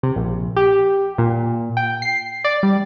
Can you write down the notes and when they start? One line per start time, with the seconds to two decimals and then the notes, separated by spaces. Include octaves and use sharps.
0.03 C3
0.16 A#1
0.56 G4
1.18 A#2
1.77 G5
2.02 C7
2.44 D5
2.63 G3